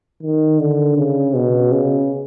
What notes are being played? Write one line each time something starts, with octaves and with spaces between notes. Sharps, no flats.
D#3
D3
C#3
B2
C#3